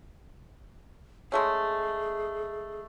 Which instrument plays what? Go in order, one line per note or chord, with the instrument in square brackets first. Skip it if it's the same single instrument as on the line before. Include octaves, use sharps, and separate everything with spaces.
[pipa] G#3 A3 C#4 [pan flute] G#4